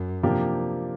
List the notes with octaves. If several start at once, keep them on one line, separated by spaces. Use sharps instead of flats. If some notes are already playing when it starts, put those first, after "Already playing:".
Already playing: F#2
C3 F3 A#3 D4 G4